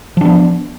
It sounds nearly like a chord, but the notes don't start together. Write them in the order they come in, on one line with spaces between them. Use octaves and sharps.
F3 D4 B3